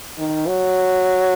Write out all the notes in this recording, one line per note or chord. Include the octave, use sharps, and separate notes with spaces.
D#3
F#3